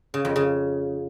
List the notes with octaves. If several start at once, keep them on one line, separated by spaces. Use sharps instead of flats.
C#3
F2
C#3